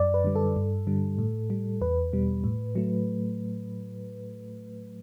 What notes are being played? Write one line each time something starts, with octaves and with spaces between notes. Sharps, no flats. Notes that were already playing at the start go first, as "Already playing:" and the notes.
Already playing: F#2 D5
B4
D3 G3
A4
G2
D3 G3
A2
G3
E2 B4
B2 G3
A2
F#3 A3